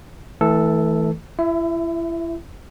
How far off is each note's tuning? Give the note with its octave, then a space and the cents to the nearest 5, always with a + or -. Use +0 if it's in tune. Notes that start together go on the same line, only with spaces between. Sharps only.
E3 -30 A3 +0 A4 +0
E4 +30 E5 +0